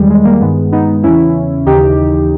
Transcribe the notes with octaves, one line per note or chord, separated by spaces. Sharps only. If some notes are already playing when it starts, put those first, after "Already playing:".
Already playing: E2 D#3 G3 G#3
G#3
G3 A#3
G2 D#3 G#3 B3
B3 D#4
E2 C#3 E3 C#4 E4
D#2 C#3 E3 D#4 G4